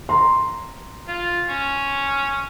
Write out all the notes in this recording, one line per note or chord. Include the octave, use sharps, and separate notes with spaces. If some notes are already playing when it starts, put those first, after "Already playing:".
A#5 C6
F4
C#4